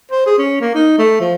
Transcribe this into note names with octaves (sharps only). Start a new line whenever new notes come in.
C5
G#4
C#4
A#3
D#4
A3
F3